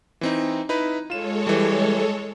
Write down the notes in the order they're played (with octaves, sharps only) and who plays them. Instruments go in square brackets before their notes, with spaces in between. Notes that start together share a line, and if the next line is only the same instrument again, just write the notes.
[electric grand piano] E3 C4 D#4
D#4 E4 B4
[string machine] G#3 A4 C#5 [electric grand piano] F4 E7
[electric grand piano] E3 G3